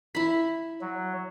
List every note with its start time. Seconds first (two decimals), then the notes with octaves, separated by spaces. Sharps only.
0.15 E4 B5
0.81 F#3